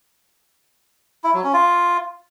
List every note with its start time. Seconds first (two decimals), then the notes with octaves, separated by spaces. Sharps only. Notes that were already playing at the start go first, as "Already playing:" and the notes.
1.24 E4
1.34 F#3
1.44 C#4
1.53 F4